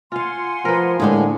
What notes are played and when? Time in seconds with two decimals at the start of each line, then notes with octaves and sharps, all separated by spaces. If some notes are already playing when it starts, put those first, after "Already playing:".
0.12 F4 F5 F#5 G#5 C6
0.65 F3 A#4 B4
1.00 A2 D3 G#3 A#3 G4 G#4